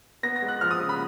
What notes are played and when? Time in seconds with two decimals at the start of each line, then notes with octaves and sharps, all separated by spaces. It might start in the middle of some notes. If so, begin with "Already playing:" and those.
0.23 B3 A#6
0.36 A#6
0.42 G#3
0.48 F#6
0.61 F3 F6
0.71 D#6
0.80 C#3
0.89 B5